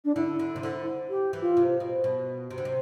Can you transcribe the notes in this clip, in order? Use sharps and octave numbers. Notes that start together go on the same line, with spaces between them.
D4
D3 E4
D3
C3
D3
G4
E3
F4
C3
B2
B2
C3
D3
C3